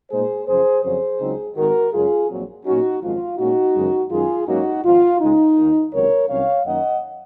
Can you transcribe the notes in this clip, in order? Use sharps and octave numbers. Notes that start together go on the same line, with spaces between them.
A#2 G#3 D#4 G#4 C5
F#2 C#3 F3 G#4 C5
F2 C#3 F#3 C#4 G#4 C5
C#2 C#3 F#3 C4 D#4
G#1 G#2 D#3 F#4 A#4
F#2 C#3 G#3 C#4 F4 G#4
A#1 A#2 F#3 C4
A#2 F#3 C#4 D#4 F#4
G#1 F#2 F3 G#3 F4
A#2 G#3 C#4 D#4 F#4
F#1 F#2 D#3 G#3
F#2 D#3 G#3 D#4 F4 G#4
G#2 F#3 A#3 C#4 D#4 F#4
G#1 G#2 F3 F4
C#2 C#3 G#3 D#4
D#2 D#3 A#3
C#2 C3 D#3 F#3 A#4 C#5
C2 C3 F#3 C#4 C#5 F5
F#2 D#3 A#3 D#4 D#5 F#5